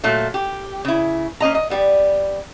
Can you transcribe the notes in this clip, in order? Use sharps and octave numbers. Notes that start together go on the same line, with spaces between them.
A#2 F#3 A3
G4
C#3 E4
A#3 C#4 D#5 A#5
D#5
G3 B3